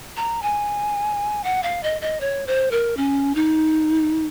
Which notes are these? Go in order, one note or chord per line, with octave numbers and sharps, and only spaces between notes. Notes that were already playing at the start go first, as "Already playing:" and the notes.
A#5
G#5
F#5
F5
D#5
D#5
C#5
C5
A#4
C#4
D#4